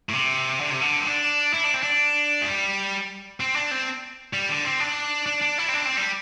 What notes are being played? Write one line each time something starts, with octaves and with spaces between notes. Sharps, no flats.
A2
C3
D3
C3
D3
C4
D4
E4
D4
C4
D4
A3
G3
C4
D4
C4
G3
D3
C4
D4
D4
D4
E4
C4
D4
C4
G3